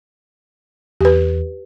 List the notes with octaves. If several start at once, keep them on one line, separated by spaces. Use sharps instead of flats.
E2 G4 B4